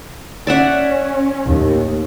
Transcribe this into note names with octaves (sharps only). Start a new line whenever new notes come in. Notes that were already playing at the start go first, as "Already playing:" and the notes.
C#4 D5 E5 F#5
D#2 A2